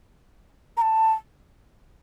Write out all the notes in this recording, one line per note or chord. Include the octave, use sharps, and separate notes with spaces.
A#5
A5